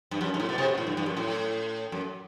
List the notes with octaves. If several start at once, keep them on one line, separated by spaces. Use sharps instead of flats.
G2
F#2
G2
A2
B2
C3
B2
A2
G2
G2
F#2
A2
F#2